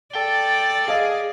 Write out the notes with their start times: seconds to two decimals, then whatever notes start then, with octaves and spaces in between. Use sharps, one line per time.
0.15 A4 D5 G5
0.88 G#4 D#5 F5